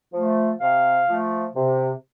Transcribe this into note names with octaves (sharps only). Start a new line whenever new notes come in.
F3 A3
C3 F5
F3 A3
C3